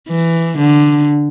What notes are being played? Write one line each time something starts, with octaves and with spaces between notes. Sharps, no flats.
E3
D3